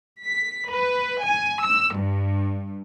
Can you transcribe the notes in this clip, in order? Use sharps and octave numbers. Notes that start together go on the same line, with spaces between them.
B6
B4
G#5
E6
G2